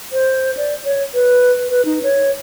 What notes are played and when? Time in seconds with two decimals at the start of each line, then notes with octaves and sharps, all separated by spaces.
0.12 C5
0.57 D5
0.85 C#5
1.14 B4
1.69 B4
1.85 D#4
2.03 C#5